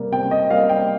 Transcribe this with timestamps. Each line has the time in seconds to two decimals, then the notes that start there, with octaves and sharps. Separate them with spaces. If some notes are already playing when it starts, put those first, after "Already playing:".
Already playing: C3 G3 A#3
0.11 C3 G5
0.31 D#5
0.50 G3 A#3 F5
0.69 G5